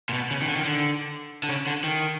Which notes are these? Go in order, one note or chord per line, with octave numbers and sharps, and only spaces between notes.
A#2
B2
C#3
D#3
D3
D#3
D3
D3
C#3
D3
D#3